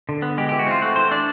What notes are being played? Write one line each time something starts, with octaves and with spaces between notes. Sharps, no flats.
D3
B3
G#3 G4
G4
E3
F#4
C4 F4
A3 F#4
E3 C5
D4 D5